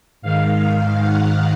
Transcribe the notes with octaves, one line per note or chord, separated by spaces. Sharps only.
G#2 D#3 F5
F#5